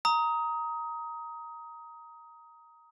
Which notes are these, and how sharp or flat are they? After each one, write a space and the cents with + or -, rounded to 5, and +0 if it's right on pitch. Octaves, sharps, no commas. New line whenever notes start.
A#5 +0 D#6 +20